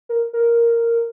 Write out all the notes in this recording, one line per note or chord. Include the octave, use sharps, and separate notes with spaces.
A#4
A#4